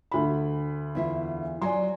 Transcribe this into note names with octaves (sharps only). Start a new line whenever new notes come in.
D2 B5
E2 E4 F4
F#3 D5 G#5 C6